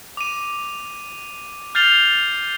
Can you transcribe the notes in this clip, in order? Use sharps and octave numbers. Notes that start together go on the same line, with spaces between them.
D6 D#7
F6 G6 A6 C7 F7 G7